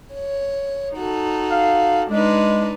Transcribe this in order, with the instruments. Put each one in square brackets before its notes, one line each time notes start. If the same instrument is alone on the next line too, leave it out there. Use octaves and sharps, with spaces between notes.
[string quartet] C#5
D#4 F#4 A4
[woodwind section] F5
[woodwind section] G#3 [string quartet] D4 D#4 B4